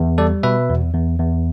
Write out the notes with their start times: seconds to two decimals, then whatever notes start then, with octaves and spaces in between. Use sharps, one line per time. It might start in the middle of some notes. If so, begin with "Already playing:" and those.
Already playing: E2
0.18 G3 A4 D5
0.43 B2 B4 E5
0.69 E2
0.94 E2
1.19 E2